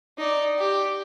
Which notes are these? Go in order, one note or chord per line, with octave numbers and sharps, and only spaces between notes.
D#4 D5
G4